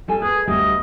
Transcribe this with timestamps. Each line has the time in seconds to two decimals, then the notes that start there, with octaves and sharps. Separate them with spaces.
0.08 G3 A4 G#5
0.22 G#4 B4
0.47 D2 G3 B3 D#5